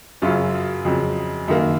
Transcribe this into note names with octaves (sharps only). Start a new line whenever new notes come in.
F#2 C#3 F#3 C#4 F4
F2 C#3 F#3
F#2 D#3 A#3